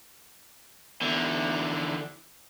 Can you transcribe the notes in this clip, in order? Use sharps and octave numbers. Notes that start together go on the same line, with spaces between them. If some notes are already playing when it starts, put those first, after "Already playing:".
E2 D3